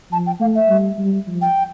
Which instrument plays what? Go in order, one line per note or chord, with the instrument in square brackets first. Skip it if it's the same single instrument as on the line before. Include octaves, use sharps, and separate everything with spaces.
[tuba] F3 [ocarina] A5
[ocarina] G5
[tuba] A3 [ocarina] F5
[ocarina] E5
[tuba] G3
G3
F3
[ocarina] G5